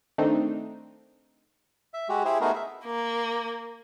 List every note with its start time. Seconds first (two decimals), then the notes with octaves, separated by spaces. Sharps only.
0.18 D#3 A3 C4 D4 D#4
1.94 E5
2.09 G#3 F#4 G4
2.25 E4 G4 G#4 C5
2.41 A3 B3 D#4 F#4 G#4 A#4
2.55 E5
2.85 A#3